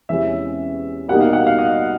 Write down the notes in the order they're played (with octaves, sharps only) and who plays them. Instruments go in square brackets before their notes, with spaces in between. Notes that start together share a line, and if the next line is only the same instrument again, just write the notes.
[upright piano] E2 C3 E3 G#3 C#4 [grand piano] E5
[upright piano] C2 B2 G3 A#3 D#4 [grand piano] F#5
[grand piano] F5
F#5
F5
D#5